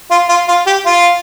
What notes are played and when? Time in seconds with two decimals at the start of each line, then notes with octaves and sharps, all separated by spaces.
0.11 F4
0.29 F4
0.48 F4
0.67 G4
0.86 F4